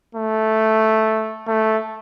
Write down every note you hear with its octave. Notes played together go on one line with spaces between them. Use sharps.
A3
A3